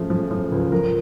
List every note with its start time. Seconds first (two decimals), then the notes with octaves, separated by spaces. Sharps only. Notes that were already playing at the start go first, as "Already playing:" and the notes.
Already playing: C#3 F3 A3
0.10 F3
0.31 F3
0.52 C#2
0.72 F3 A#4